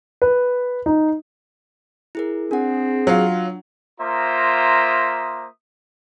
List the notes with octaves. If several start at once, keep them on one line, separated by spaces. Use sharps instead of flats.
B4
D#4
E4 G#4 A#4
C4 D4 G#4 F#5
F#3 F4
A#3 F4 C5 E5 A#5 D#6